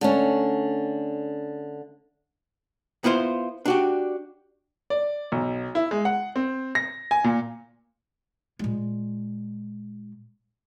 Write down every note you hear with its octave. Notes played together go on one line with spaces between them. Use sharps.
D3 A3 C#4
B3 E4 F4 C5
D4 F#4 G4
D5
B1
E4
G#3
F#5
C4
A#6
G#5
A#2
A#2 G#3